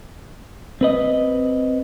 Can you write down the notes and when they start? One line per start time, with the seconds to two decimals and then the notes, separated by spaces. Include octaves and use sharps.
0.81 C4 B4 D#5